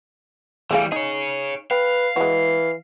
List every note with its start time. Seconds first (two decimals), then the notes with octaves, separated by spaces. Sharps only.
0.71 E3 G3 A3 G#4 F5
0.92 D#4 G#4 C#5
1.71 B4 F5 G5
2.16 E3 G#3 F#4